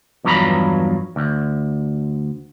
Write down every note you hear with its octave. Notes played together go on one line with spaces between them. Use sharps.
E2 G2 F3 F#3 A#5 B5
D2